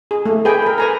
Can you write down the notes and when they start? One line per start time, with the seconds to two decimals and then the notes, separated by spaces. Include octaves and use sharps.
0.11 G#4
0.26 A3
0.45 G#4 B4 G5 G#5
0.62 A4 A#4
0.78 B4 G#5 A#5